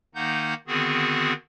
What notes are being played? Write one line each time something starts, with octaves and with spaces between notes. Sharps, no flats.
D#3 A#3 D#4 F#5 G6
D3 D#3 B3 C4 F#4 G#4